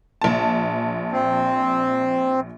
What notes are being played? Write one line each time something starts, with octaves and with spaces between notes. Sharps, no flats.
A#1 A5
C4